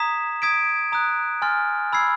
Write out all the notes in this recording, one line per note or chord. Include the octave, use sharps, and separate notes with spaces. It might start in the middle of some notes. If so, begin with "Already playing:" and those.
Already playing: A#5 D#6 G#6 B6 E7
D#6 G#6 B6 D7
A#5 D#6 F#6
G#5 C6 F6 A6
B5 E6 G#6 C7